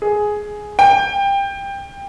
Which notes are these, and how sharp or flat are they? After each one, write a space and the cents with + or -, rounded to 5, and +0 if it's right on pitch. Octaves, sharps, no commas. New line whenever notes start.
G#4 +5
G5 +20